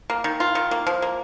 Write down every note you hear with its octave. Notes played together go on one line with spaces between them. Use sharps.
A#3
D#3
F4
D#3
A#3
F3
A#3